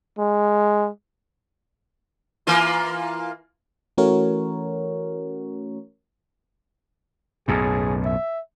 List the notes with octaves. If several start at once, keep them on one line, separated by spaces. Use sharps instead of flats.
G#3
E3 A#3 F4
E3 A3 C#4 F#4 A#4 C#5
B1 F#2 A2 G#4
E5